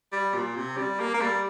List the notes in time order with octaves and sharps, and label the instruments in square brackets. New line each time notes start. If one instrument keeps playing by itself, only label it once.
[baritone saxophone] G3
A#2
C3
G3
A#3
A#3
G3